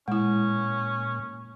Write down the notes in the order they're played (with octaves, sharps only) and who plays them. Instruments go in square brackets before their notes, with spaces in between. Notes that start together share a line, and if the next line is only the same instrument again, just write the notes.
[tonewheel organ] A#2 [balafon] G#3 E4 [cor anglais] C#4